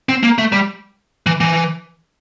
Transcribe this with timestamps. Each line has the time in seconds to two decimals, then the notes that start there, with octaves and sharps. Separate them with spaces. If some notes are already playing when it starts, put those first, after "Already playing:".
0.09 C4
0.23 A#3
0.38 A3
0.52 G3
1.26 E3
1.41 E3